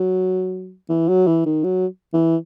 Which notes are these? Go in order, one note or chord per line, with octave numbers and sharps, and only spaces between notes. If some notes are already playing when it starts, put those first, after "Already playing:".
Already playing: F#3
E3
F#3
E3
D#3
F#3
E3